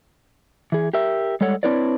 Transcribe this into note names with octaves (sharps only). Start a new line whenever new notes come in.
E3 G#4
G4 A#4 E5
G3 G#3 A4 C#5 F#5
C4 D4 E4 B4 C#5 D5